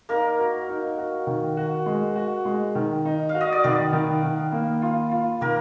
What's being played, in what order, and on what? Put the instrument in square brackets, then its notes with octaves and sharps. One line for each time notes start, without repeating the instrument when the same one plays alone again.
[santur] A#3 A#4 [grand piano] D#4
[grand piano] F#4
D#4
F#4
D#3
F#4
G#3
F#4
G#3
D#3
D#4
[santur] F5
[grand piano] F#4
[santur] D#5
D5
[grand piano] D#3 [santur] B3 B4
[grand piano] D#3
D#3
A#3
F4
F4
[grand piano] D#3 [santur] A#3 A#4